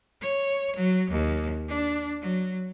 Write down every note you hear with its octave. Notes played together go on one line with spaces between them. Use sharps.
C#5
F#3
D#2
D4
F#3